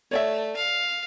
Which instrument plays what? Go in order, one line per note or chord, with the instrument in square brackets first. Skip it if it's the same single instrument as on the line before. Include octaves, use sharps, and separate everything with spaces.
[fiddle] A3 [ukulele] C#5 D5 E5
[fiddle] F5